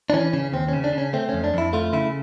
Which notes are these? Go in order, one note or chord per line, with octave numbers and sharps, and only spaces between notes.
D4
E3 C#4
C#3 C#4
D#2 C4
C#3 C#4
D4
C#3
C#4
A3 C4
F2 C#4
D4
F2 E4
A3 F4
C#3 E4